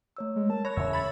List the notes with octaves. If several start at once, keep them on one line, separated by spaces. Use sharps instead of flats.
A3 C#5 E6
G#3
A#4 A5
C#5 B5 F#6 G#6 A#6
E2 C#3 C#4 E5 E6 A#6
B5 A6